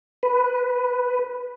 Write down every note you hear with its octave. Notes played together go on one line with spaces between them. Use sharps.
B4